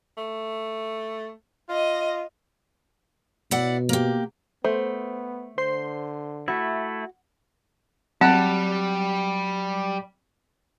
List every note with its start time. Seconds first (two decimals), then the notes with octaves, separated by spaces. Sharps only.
0.17 A3
1.69 F4 D#5
3.51 B2 E4 D5 F#5
3.89 A#3 G4
4.65 A3 B3 C5
5.58 D3 C5 C6 C7
6.48 A3 E4 F#4
8.21 F#3 G3 C4 F#5 A5